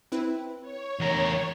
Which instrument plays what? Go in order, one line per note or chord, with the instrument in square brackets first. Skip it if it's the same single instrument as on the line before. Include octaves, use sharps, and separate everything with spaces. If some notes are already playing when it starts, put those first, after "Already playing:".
[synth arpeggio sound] C4 E4 B4
[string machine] C#5
[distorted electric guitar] E2 A#4